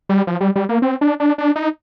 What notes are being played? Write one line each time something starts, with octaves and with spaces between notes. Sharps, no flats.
G3
F3
G3
G3
A#3
C4
D4
D4
D4
D#4